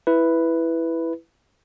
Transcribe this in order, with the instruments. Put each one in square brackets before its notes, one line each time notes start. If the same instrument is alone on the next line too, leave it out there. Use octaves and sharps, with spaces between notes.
[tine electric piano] E4 B4